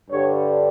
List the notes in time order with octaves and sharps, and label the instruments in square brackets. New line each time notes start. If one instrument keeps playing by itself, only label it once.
[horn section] G2 D3 G3 C#5